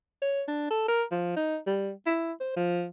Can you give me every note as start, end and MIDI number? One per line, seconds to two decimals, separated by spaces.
0.22 0.43 73
0.48 0.67 62
0.70 0.86 69
0.88 1.04 70
1.12 1.36 53
1.37 1.58 63
1.67 1.91 55
2.06 2.33 64
2.40 2.56 72
2.56 2.86 53